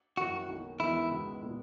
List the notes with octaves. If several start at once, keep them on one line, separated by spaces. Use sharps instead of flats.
F#2 D#3 A#3 E4 F#4
B1 B2 A#3 D#4
E2 D#3 G#3 B3 D#4 E4
C#2 B2 G#3 B3
A#2 G#3 B3